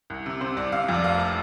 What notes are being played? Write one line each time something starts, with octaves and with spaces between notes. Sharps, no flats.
C2
C3
C3 C5
C2 D5
C3 F5
F2
D5
F1 F5
A5